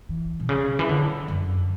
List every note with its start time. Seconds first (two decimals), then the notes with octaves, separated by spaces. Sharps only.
0.09 E3
0.40 B2
0.49 C#3
0.79 E3
0.89 D3
1.28 F#2